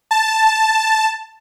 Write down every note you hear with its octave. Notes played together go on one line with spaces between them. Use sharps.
A5